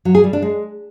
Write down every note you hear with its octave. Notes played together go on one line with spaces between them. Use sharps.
F#3
G#4
G3
D4
G#3